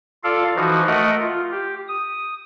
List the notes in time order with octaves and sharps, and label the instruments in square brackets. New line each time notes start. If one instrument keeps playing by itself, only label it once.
[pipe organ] F4 A4 D5 F5
E3 F3 D#4 F#4
A3 A#4 D#5 F#5
F4
G4
D#6